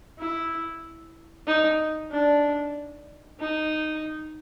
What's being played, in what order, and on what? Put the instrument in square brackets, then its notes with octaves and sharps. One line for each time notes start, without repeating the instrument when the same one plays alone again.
[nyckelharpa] E4
D#4
D4
D#4